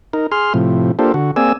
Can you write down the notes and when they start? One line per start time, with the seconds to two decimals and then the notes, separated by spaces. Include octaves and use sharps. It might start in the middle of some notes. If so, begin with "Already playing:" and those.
0.13 D#4 A#4
0.32 G#4 C6 F6
0.54 A2 C3 F3
0.99 A#3 D4 F4 G4 A4 C5
1.14 D3 F#4
1.36 A#3 C4 G#4 D5 G#5 E6